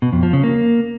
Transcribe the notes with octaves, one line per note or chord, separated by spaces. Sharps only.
B2
F2
F3
C#3
A#3